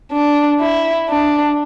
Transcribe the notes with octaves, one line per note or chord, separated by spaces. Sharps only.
D4
E4
D4